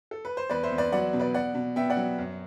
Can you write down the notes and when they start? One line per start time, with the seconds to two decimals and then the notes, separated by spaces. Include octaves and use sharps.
0.11 A4
0.25 B4
0.37 C5
0.50 E2 B4 D5
0.63 C5 E5
0.71 E2
0.78 B4 D5
0.92 F#3 D5 F#5
1.13 B2
1.20 B4 D5
1.34 B2 D5 F#5
1.55 B2
1.76 B3 E5 G5
1.90 D5 F#5
1.97 F#3
2.18 F#2